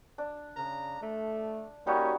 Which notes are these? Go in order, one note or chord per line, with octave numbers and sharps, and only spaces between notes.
D4
C#3 A#5
A3
G3 A#3 C#4 D#4 F#4